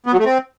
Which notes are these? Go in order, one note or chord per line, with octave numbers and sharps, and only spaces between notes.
B3
F#3
A3
C4